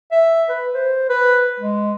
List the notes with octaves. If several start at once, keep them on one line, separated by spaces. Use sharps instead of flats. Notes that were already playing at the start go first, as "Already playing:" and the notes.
E5
B4
C5
B4
G#3